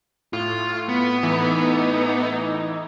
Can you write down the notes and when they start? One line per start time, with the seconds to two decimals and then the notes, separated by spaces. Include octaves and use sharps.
0.33 A2 F4
0.89 B3
1.23 A2 E3 D#4